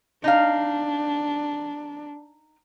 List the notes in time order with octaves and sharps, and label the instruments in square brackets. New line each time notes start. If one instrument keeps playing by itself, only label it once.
[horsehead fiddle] D4 [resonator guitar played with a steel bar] D#4 F5